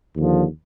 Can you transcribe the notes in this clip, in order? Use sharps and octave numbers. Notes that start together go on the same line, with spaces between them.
D#2 D3 F3